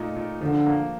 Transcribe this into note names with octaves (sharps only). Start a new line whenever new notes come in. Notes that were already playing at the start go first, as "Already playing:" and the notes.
Already playing: A#2 A3 D#4
A#2
D3 F3
A#3